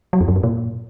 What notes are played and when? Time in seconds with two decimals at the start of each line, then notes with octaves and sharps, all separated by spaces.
0.13 F#3
0.21 F2
0.28 F#2
0.36 G2
0.43 A#2